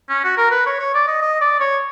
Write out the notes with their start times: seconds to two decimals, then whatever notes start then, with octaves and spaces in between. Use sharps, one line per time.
0.09 C#4
0.24 F#4
0.37 A#4
0.51 B4
0.66 C#5
0.79 C#5
0.94 D5
1.07 D#5
1.21 D#5
1.41 D5
1.60 C#5